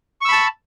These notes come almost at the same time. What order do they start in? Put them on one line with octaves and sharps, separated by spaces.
C#6 E6 B5 A5